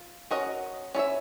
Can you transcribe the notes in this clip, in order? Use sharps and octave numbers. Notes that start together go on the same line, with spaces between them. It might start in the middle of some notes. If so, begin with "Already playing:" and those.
Already playing: F4
C#4 F#4 A#4 D#5
C#4 E4 A4 C#5 E5